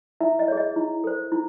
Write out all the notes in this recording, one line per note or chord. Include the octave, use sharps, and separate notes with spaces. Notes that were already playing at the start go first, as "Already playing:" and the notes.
E4 E5
D#5
G#4 C#5
D#5
E4
A4 C5
E4